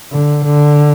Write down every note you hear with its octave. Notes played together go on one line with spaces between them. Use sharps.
D3
D3